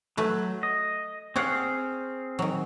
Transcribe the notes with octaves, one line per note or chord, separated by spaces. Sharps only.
F#3 A3 B4
D#5
C4 G#4 C#5 D5 F5 F#5
D#3 F#3